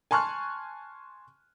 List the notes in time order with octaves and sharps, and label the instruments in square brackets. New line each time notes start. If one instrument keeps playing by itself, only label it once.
[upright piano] G#5 A5 C6 C#6 F6 F#6